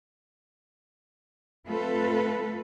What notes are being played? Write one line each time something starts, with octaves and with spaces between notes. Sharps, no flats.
A3 C4 F4 A4 B4